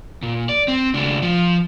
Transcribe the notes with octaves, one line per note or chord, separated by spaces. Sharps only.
A#2
D5
C4
C#2 D4
F3